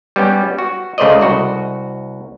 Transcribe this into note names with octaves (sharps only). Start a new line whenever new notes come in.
G3 B3 C#4 G5
F#4
C#2 C#3 A3 C5 D5 D#5
C2 F#4